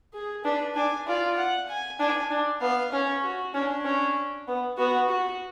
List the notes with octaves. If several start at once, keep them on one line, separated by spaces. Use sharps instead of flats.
G#4
D4 B4
D4 G#5
F4 D5
F#5
G#5
D4 G#5
D4
B3 F5
C#4 C#5
F#4
C#4 D4
C#4
B3
B3 F#4
F#4